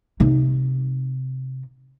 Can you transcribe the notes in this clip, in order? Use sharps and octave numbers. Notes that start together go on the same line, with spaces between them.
C3 D#4